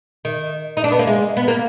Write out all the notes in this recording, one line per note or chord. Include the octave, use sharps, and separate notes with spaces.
D#3
D#4
D4
B3
A#3
G#3
B3
A#3